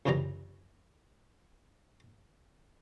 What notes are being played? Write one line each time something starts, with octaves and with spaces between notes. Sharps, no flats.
C#2 F#2 C3 E3 D5 A#5